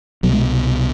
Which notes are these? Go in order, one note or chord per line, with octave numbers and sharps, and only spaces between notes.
C2 B2 F#3
G#3